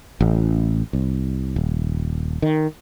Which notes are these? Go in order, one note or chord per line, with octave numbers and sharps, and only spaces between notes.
A1
C2
D#1
D#3